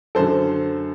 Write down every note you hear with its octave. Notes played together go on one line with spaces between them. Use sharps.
F#2 D3 A4 C5